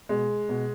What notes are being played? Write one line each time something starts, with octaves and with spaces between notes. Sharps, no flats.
B2 G#3
B2